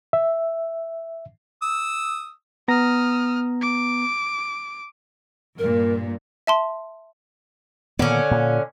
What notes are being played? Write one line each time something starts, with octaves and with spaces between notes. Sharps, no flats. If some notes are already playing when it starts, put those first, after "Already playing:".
E5
D#6 E6
B3 A#5 D#6 F6 A#6
D6
G2 A#2 A#4
E5 A5 C6
A#2 D3 D#3 B3 C#4
A#2